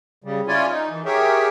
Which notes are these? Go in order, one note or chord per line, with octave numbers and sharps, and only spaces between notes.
C#3 G3
C#4 E4 F4 C#5 D5 G#5
D#4
D#3 E3
G4 G#4 A#4 C#5 E5 G5